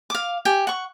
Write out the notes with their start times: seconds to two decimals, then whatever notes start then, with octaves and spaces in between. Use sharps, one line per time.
0.10 F5 D6
0.45 G4 G5 G#5
0.67 F#5 C#6